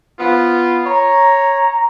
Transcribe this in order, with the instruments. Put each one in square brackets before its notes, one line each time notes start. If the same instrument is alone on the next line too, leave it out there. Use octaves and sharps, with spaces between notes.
[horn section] B3 F4
[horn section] C#5 [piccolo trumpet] A#5